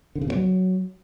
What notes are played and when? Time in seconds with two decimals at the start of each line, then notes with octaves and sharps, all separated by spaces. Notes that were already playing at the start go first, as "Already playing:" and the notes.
0.15 D3
0.21 C#3
0.27 B2
0.33 F#3